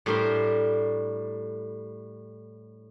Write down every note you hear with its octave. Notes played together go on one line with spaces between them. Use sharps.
A2 G3 D4 A#4 C5 C6